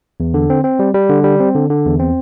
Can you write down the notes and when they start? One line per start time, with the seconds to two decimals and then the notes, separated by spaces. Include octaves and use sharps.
0.20 E2
0.34 D3
0.50 C4
0.64 C4
0.79 G3
0.94 G3
1.10 D3
1.24 G3
1.40 C4
1.55 D3
1.70 D3
1.85 E2
1.99 C4